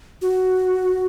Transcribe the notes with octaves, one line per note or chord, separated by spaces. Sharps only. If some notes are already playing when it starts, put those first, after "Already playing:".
F#4